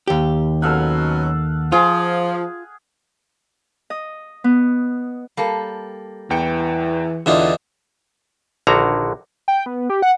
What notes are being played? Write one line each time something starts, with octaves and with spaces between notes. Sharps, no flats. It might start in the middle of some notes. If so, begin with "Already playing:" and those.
D#2 G4
B2 F#3 C#4 A4 F5 F#5
F3 F4 G#4
D#5
B3
G3 A#3 A4
E2 E3 G5 C#7
E2 D3 E3 D4 D#4 F4
A#1 D3 D#3 F#4 A#5
G5
B3
G4
F#5